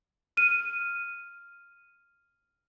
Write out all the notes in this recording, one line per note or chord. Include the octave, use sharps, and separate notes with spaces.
F6 D#7